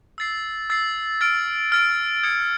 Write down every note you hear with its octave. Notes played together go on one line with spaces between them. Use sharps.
E6 A6 C7
E6 A6 C7
F6 A6 D7
F6 A6 D7
D#6 G#6 C#7